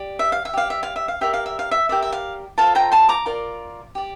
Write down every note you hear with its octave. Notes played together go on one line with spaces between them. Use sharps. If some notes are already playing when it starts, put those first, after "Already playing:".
Already playing: G4 D5
E5
F5
E5
G4 D5 F5
E5
F5
E5
F5
G4 A#4 D5 E5
F5
E5
F5
E5
G4 A#4 D5 E5
E5
F5
F4 A4 C5 F5 A5
G5 A#5
A5 C6
A#5 D6
F4 A#4 D5
G4 D5